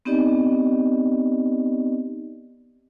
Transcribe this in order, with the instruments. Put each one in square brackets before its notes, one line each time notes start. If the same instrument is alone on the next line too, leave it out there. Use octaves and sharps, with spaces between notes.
[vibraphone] B3 C4 D#4 G4 D5 D#5